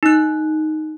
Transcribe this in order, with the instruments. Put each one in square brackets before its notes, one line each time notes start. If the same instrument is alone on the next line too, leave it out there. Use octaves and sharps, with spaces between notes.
[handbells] D#4 F#6